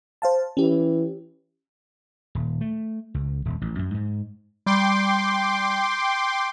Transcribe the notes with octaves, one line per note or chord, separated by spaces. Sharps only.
C5 F5 A5
E3 C#4 G4
D#1
A3
C#2
D#1
A1
F#2
G#2
G3 G5 C6 D6